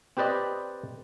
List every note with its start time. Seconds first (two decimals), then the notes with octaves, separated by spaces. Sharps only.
0.17 C4 G4 B4 D5 D#5